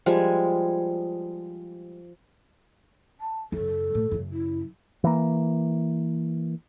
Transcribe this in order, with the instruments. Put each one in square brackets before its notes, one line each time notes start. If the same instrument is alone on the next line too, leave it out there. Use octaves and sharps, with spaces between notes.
[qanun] F3 G3 G#3 G#5
[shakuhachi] A5
[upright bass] F#2 C#3 [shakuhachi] A4
[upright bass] A2
F#2 C#3
[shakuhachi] E4
[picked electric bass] E3 A#3